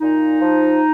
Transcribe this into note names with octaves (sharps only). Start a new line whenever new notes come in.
A#2 D#4
F3